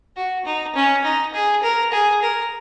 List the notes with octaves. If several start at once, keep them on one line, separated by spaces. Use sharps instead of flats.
F#4
D#4
C#4
D#4
G#4
A#4
G#4
A#4